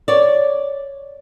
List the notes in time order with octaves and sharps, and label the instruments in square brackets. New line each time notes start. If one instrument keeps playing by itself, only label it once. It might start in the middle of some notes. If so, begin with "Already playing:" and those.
[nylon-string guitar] C#5 D5